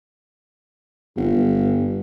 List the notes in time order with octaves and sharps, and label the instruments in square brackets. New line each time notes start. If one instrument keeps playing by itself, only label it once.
[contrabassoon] G1 [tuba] G2